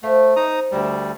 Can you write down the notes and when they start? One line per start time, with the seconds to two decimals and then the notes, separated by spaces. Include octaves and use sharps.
0.03 A3 C5 F5
0.36 C4 D#4 A#5 D#6
0.72 D2 G3 B3 E4 A#4